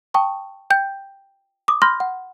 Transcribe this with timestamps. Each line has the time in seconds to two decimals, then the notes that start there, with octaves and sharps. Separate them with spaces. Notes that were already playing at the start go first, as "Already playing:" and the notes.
0.14 G5 A5 C#6 D#6
0.70 G5 G6
1.68 D6 D#6
1.82 B5 C6 F6 G6 A#6
2.00 F#5